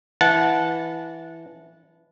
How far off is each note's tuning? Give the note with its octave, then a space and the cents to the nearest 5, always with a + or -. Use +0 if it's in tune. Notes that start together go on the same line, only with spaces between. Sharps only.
E3 +0 F#5 -20 A5 -20